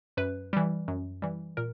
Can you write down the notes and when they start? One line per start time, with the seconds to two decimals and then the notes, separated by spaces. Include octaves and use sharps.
0.17 F#2 B4
0.53 E3 G3
0.88 F#2
1.22 E3 G3
1.57 A#2 A#4